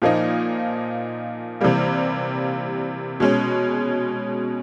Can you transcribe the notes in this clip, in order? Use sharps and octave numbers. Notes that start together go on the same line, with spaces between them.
A#2 F3 A#3 D#4
C3 E3 G3 A#3
B2 G#3 C#4